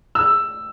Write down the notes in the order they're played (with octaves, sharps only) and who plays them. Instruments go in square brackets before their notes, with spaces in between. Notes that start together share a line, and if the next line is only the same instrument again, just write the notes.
[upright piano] E6